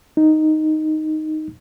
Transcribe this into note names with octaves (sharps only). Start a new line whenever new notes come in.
D#4